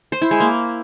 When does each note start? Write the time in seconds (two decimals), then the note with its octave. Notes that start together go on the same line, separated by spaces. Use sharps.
0.12 C5
0.22 E4
0.31 G#3
0.40 A#3